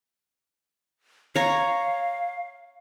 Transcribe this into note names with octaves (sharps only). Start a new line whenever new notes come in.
C#5 F5 A#5